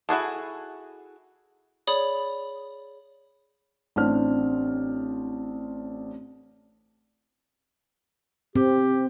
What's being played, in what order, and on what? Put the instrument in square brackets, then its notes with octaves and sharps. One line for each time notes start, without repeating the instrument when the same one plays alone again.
[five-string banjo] E4 F#4 G#4 A4
[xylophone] G#4 C#5 D5 B5 D#6
[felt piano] A1 C4 D4 F6
[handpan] C4 [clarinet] G4